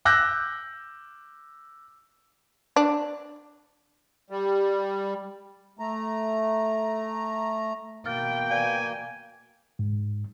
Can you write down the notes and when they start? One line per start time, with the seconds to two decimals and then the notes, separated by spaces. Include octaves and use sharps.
0.05 D6 E6 F#6 G6 A#6
2.76 D4
4.30 G3
5.79 A3 A#5
8.06 B2 A#3 G5 F6 A6
8.50 B4 D5 F5 G#5
9.79 G#2